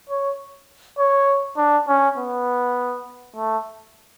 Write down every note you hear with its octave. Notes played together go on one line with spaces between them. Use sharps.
C#5
C#5
D4
C#4
B3
A3